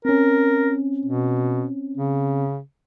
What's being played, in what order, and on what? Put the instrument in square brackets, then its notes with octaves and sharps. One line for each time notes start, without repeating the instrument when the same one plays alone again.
[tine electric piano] C4 C#4 [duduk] A#4
[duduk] B2
C#3